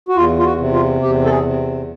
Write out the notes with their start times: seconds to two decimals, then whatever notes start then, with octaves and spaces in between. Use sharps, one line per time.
0.08 F#4
0.16 E2 F4
0.39 F4
0.45 F#4
0.59 C3
0.73 F4
1.02 E2 G4
1.25 A4
1.30 G#4
1.44 C3